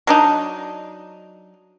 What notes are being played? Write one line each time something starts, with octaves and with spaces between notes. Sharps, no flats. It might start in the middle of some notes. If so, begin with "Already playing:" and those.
F#3 D4 D#4